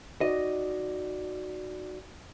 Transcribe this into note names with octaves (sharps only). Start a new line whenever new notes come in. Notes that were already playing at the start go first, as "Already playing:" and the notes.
D#4 F#4 D5 D#5